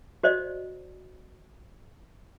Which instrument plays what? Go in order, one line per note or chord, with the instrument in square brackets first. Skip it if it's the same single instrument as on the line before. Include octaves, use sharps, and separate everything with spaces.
[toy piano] F#4 C5 D5 D#5